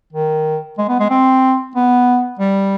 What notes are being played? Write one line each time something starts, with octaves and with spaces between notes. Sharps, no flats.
D#3
G#3
B3
G#3
C4
B3
G3